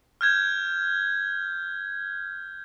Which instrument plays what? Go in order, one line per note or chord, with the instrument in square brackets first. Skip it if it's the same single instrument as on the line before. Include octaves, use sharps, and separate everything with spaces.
[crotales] F6 G6 G#6